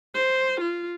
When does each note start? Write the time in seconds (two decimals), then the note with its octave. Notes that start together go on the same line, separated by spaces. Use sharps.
0.15 C5
0.61 F4